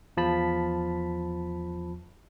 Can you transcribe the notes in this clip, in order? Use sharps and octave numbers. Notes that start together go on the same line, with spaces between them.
E2 F3 A5 B5 B6